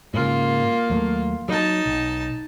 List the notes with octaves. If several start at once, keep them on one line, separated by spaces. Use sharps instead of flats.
G#2 C#3 A#3 F4
D#2 F#3 A3
F#3 D#4 A5
B1